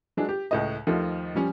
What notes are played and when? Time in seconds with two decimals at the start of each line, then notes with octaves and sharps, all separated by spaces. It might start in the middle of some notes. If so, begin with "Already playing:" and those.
0.17 F#3 G#3 D4
0.29 G4
0.51 C#2 A2 D#5
0.87 D#2 D#3 F3 A3
1.35 F3 G3 C#4